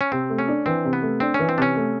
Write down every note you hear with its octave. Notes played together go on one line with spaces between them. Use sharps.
C#4
C3 C4
A3
C#4
D4
E3 C4
C3
B3
A3
C4 D4
E3 C#4
C4
C3 C#4 D4
A3